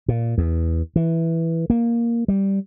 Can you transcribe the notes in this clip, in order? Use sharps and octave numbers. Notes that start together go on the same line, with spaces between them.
A#2
E2
E3
A#3
G3